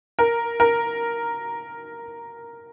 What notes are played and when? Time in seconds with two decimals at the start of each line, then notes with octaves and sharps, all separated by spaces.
0.19 A#4
0.60 A#4